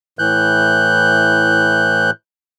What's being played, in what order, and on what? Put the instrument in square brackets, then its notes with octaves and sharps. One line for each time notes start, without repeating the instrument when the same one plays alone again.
[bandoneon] A2 E3 F#6 G6